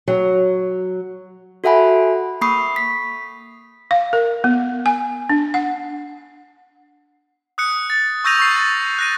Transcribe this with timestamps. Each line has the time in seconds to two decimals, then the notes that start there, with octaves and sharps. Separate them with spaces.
0.08 F#3
1.64 F#4 A4 E5 F#5 G#5 B5
2.41 A#3 B5 C#6 D#6 C7
2.76 B6
3.91 F5
4.13 A#4
4.44 B3
4.86 G#5
5.29 D4
5.54 F#5
7.58 D#6 F#6 C#7
7.90 A6
8.24 C#6 E6 G6 A#6 D#7 F7
8.39 C#6 C7
8.56 A6
8.99 F#6 A#6 D#7